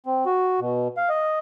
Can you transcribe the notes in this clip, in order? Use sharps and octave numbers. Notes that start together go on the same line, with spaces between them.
C4
F#4
B2
F5
D#5